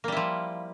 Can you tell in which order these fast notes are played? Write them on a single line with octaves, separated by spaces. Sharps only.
A#3 G3 E4 F3